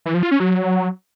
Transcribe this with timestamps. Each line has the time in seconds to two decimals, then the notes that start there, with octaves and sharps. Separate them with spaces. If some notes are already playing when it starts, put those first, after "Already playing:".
0.06 E3
0.14 F3
0.23 F4
0.31 C#4
0.40 F#3